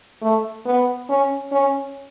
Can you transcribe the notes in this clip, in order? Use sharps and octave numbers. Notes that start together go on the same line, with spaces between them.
A3
B3
C#4
C#4